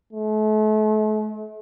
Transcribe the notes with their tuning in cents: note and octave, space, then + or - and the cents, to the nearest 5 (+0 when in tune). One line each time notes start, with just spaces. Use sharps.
A3 -40